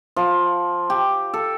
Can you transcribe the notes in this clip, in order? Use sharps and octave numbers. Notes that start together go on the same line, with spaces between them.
F3
G4
A4